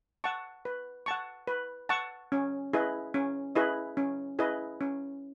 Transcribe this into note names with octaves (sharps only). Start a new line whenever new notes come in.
F#5 A5 C#6
B4
F#5 A5 C#6
B4
F#5 A5 C#6
C#4
E4 G#4 B4 D#5
C#4
E4 G#4 B4 D#5
C#4
E4 G#4 B4 D#5
C#4